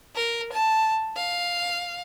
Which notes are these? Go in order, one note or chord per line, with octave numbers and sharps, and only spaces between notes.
A#4
A5
F5